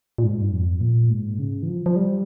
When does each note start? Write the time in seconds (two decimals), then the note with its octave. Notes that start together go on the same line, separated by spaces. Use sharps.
0.18 A#2
0.24 G#2
0.41 G2
0.53 F2
0.81 A#2
1.10 G#2
1.39 C#3
1.62 E3
1.68 F3
1.86 F3
1.96 G3